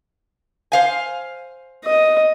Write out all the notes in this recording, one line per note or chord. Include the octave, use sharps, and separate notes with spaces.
C5 F5 G#5
D#5